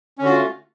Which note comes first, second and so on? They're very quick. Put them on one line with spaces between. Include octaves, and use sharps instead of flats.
C#4 D3 F#4 F4 A3